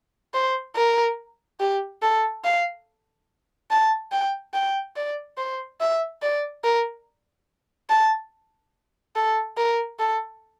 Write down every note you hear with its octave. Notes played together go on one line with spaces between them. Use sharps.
C5
A#4
G4
A4
F5
A5
G5
G5
D5
C5
E5
D5
A#4
A5
A4
A#4
A4